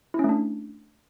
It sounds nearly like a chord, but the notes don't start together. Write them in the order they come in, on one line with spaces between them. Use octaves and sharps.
E4 C#4 A3 D4